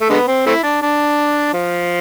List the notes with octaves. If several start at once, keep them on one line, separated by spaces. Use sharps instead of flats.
A3
D3 G#3 B3
C4
A3 C4 E4
D4
D4
F3